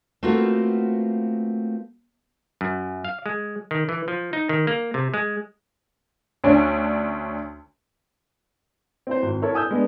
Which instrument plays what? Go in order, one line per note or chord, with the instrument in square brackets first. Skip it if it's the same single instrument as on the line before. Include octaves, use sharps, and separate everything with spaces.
[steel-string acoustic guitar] A3 A#3 C4 F4 F#4 B4
[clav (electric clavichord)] F#2
F5
G#3
D#3
E3
F3
D#4
D#3
A#3
C3
G#3
[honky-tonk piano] D2 C#4 D4
[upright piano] C4 E4 C5
G#1
E4 A4 A#4 C#5
G#5 D#6 E6 G6
G#3 B3 D4